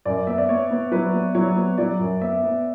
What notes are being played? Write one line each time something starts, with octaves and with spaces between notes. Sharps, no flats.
F#2 D5
B3 E5
D5
B3 C#5
B3
F#3 B4
B3
F#3 C#5
B3
F#3 D5
F#2
B3 E5
B3